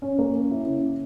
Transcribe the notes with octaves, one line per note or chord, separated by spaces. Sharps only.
C#4
A#3
C#4
E4
C#3